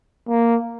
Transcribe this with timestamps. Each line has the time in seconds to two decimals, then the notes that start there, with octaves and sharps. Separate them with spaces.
0.29 A#3